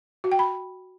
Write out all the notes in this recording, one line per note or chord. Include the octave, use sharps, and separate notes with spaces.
F#4
G5
B5